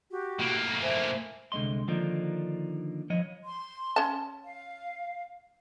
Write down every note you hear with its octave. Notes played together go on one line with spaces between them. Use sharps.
F#4 G4
A2 A#3
C5 E5 G#5
C2 D3 G#3 D#5 C6
D3 D#3 F3 A#3 D4 D#4
F3 C#5 D#5
C6
C#4 A5
F5